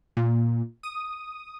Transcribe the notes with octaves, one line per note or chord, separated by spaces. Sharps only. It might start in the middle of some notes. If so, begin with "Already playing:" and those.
A#2
D#6